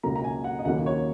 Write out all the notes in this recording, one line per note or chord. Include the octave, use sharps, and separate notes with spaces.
C#2 C#3 F#3 A#3 A#5
A#5
G#5
F#5
D#5
D#2 C#3 F#3 A#3 F#5
C#5